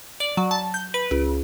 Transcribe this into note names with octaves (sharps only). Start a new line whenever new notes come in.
D5
F#3
A5
G6
B4
C#2